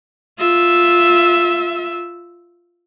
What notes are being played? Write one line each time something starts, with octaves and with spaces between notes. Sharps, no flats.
F4 E5